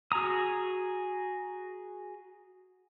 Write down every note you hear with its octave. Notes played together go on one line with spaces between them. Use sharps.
F#4 G#4 A#5 D#6